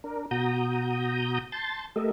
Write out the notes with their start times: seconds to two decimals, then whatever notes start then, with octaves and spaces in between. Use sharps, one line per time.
0.04 D4 A#4
0.31 B2 F#4 A#5 D#6 G6
1.52 A5 C6 G6 A6
1.96 A3 G4 A4 A#4 D#5 E5